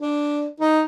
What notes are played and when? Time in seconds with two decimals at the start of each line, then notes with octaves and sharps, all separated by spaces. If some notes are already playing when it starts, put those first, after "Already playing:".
0.02 D4
0.60 D#4